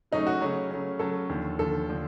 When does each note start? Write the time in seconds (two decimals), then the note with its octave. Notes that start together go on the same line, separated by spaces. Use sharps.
0.12 C#3 F#3 A3 C#4 D#4
0.27 F#4
0.41 C#3 F#3 A3 C#4
0.71 C#3 F#3 A3 C#4
0.99 C#3 F#3 A3 C#4 A4
1.29 D#2 D3 F3
1.59 D#2 D3 F3 A4
1.89 D3 F3